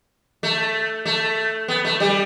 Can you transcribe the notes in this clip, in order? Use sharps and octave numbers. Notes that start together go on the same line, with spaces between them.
A3
A3
B3
A3
G3